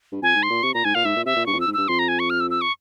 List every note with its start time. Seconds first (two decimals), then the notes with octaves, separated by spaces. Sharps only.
0.12 G2
0.22 F2 G#5
0.36 G#2
0.43 C6
0.50 A#2
0.63 C3 C#6
0.74 A#2 A#5
0.85 G#2 G#5
0.95 A#2 F5
1.05 G#2 E5
1.16 A#2
1.26 C3 E5
1.36 A#2
1.46 G2 C#6
1.53 E2
1.57 F2 E6
1.67 G#2
1.74 G2 E6
1.88 F2 C6
1.99 A#5
2.08 G#5
2.19 C#6
2.30 F6
2.40 E6
2.51 E6
2.61 C#6